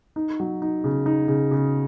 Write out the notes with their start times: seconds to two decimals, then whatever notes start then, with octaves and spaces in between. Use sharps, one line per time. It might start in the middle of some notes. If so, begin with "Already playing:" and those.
0.16 D#4
0.40 F#3
0.62 D#4
0.84 C#3
1.06 D#4
1.28 C#3
1.51 C#3